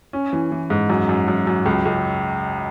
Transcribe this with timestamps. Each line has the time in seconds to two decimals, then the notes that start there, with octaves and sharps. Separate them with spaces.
0.13 C#4
0.33 E3
0.52 E3
0.70 G#2
0.90 F#2
1.09 F#2
1.28 F#2
1.47 F#2
1.66 C#2
1.85 C#2